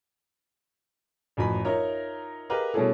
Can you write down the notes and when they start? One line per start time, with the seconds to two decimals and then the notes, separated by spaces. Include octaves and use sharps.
1.37 A1 F#2 F3 B5
1.64 D#4 F4 A#4 C#5 E5
2.50 G4 G#4 A#4 B4 D#5 F5
2.74 B2 G3 C#4 E4 G#4 A4